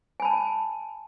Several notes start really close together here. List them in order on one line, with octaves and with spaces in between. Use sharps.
G#5 B5 A5